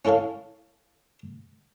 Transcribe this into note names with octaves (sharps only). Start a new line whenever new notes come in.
C#4 E4 A4 C#5 F5